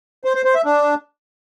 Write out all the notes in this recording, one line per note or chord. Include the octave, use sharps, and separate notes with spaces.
C5
C5
C5
E5
D4